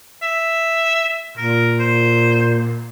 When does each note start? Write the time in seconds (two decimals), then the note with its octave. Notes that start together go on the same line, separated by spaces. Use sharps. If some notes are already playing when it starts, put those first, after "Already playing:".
0.22 E5
1.37 A#2 A#4
1.80 C5